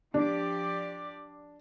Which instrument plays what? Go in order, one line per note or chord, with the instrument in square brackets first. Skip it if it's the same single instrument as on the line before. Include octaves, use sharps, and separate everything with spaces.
[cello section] F3 G4 D5 [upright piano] D4